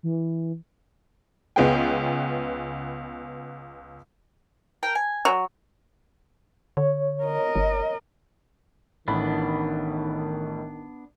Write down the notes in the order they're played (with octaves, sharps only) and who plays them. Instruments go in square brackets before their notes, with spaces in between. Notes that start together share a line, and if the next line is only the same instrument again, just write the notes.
[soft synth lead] E3
[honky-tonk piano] C#2 B3 G#4 G5
[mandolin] A#4 G5
G#5
[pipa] F#3
[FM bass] D3 [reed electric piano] C#5
[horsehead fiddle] A#4 D#5
[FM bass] G1
[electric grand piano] A1 A2 B5 [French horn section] D#3 [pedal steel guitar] B3 D4